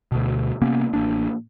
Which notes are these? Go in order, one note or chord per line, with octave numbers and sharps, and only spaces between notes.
D2 B2
C3 A#3 B3 C#4
A1 A#3 D4